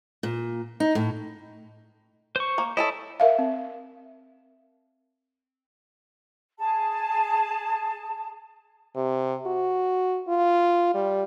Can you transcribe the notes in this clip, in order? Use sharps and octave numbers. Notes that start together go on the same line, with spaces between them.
A#2
D#4
A2
C5 C#6
A#3
E4 A4 C#5 D#5
A#4 E5 F5
C4
G#4 A5
C3
F#4
F4
G3